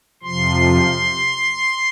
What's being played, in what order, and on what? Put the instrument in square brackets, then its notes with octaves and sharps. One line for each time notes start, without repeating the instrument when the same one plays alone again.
[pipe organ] F2 C3 F3 C6